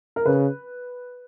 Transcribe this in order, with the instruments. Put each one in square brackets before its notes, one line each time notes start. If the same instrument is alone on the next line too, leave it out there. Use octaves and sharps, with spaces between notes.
[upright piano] A#4
[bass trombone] C#3 [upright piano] B4